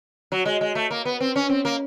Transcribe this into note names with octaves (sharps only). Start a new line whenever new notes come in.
F#3
G#3
G#3
A3
A#3
B3
C4
C#4
C4
A#3